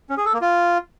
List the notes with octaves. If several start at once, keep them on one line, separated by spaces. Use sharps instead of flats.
C#4
G#4
A4
A#3
F4